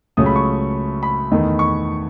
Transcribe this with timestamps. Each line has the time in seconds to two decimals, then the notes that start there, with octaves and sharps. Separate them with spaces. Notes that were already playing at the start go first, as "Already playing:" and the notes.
0.17 C#2 C#3 F#3 A3 C#4 D#6
0.26 B5
0.36 C#6
1.03 B5
1.31 E2 D#3 A3 D#4
1.59 C#6